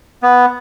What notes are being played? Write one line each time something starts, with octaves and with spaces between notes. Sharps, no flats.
B3